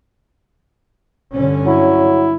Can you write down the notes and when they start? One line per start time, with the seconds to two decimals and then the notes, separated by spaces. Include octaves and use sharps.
1.34 G2 D3 C#4
1.66 F#3 E4